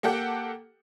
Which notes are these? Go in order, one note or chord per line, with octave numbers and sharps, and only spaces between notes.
A#3 G4 A4 F#5 G5